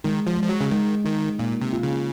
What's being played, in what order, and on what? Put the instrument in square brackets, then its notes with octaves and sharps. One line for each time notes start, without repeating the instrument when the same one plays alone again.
[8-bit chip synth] D#3 [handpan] G#3
[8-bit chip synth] F3
[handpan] G#3
[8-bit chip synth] F3
F#3
C#3
[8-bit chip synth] D#3 [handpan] G#3
[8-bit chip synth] D#3 [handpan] D#4
[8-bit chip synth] A#2 [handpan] A#3
[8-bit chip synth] C3
[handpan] F4
[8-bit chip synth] C#3